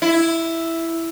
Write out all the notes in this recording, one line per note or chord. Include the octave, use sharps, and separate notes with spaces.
E4